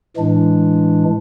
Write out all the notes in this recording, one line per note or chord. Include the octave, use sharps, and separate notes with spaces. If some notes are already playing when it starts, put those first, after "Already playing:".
A2 E3 G#3 D4